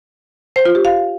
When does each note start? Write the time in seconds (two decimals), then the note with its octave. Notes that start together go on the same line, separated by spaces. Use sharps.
0.56 C5
0.65 F4
0.75 G4
0.85 F5